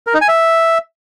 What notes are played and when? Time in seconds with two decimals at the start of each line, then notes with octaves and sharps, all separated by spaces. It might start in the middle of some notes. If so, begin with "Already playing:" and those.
0.07 A#4
0.14 D#4
0.21 G#5
0.28 E5